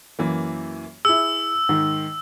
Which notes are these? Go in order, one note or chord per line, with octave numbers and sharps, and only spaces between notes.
F#2 E3 A#3
E4 G#4 E6
G#2 D#3